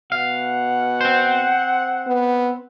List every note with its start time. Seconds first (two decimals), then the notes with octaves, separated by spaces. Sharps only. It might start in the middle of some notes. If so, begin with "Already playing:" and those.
0.12 B2 F5 F#5
1.01 C4 C5
2.07 B3